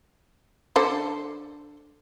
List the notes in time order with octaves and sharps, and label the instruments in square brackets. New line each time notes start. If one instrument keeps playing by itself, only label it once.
[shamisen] D3 A4 C5